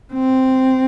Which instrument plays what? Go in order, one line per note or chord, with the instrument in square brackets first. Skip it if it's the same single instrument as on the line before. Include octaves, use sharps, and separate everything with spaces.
[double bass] C4